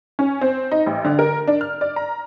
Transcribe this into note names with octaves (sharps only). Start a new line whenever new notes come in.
C#4
C4
D#4
A1
D3
A#4
D4
F6
D5
A#5